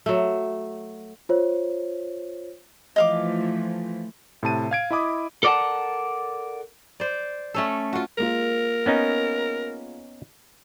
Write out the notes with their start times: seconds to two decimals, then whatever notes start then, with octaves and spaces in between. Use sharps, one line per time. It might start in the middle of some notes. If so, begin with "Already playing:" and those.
0.06 F#3 A3
1.29 F4 C5 C#5
2.96 E3 F3 A3 D#5 F5 D6
4.43 A2 C3 A5 D#7
4.71 F5 G#6 D7
4.91 E4 D#5 B5 D6 D#6
5.43 A4 A#4 D5 D#5 F#5 A5
7.00 C5 D5
7.54 A3 C#4 A4
7.93 F4 F#4
8.18 G#3 A#3 F4 A#4
8.86 B3 C#4 D#4